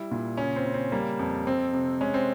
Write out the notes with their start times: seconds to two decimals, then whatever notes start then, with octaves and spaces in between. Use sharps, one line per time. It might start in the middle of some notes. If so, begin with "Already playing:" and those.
Already playing: G3 E4
0.11 A#2
0.37 C#3 C#4
0.56 C4
0.66 C#3
0.74 C4
0.92 G3 A#3
1.19 F2
1.47 F2 C4
1.73 C3
2.01 G#3 C#4
2.14 C4